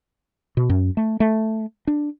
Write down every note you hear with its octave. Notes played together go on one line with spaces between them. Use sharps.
B2
F#2
A3
A3
D4